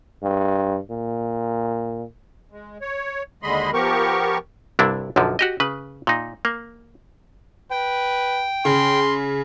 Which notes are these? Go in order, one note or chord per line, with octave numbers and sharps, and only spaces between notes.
G2
A#2
G#3
C#5
D#2 D3 G#3 D#5 B5 C6
F3 B3 G4 A#4 C#6
C2 G2 C3 D4 E4
B1 F#2 D3 F3
F#4 G4 D#5
C#3 B4
A#2 D#4
A#3
B4 G5
C#3 C6